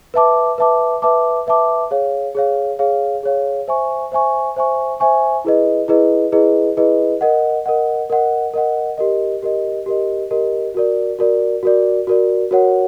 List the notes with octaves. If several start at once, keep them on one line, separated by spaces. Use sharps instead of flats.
B4 E5 A5 D6
B4 E5 A5 D6
B4 E5 A5 D6
B4 E5 A5 D6
G#4 C#5 F5
G#4 C#5 F5
G#4 C#5 F5
G#4 C#5 F5
C5 E5 G#5 C#6
C5 E5 G#5 C#6
C5 E5 G#5 C#6
C5 E5 G#5 C#6
E4 G#4 B4 D#5
E4 G#4 B4 D#5
E4 G#4 B4 D#5
E4 G#4 B4 D#5
A#4 D#5 F#5
A#4 D#5 F#5
A#4 D#5 F#5
A#4 D#5 F#5
G4 A#4 D#5
G4 A#4 D#5
G4 A#4 D#5
G4 A#4 D#5
F#4 A#4 D5
F#4 A#4 D5
F#4 A#4 D5
F#4 A#4 D5
F#4 A#4 C#5 F#5